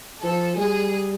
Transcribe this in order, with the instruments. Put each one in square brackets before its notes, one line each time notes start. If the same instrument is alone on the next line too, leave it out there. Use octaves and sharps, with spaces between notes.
[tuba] F3 [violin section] A4
[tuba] G3 [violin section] G#4